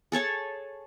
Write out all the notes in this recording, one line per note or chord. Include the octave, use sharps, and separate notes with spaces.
G#4 A4 C#5 A5